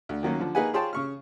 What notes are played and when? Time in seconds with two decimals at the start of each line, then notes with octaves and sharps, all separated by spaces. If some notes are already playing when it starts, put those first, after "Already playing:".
0.09 D2
0.23 D#3 F#3 A#3 C#4
0.40 D3 F3
0.55 A#3 D#4 G#4 B4 F#5 G#5
0.73 F4 G#4 C5 C#5 G5 A5
0.93 C#3 C#6 F6